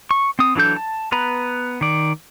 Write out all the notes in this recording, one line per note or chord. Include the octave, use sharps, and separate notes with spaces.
C#6
C4 D#6
E3 F#3 D4 A4 G6
A5
B3 B4 A#5 B5
D#3 D5